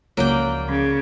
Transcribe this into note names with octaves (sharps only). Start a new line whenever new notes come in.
C#2 F3 F#3 A#3 C#4 D5 G5
C#3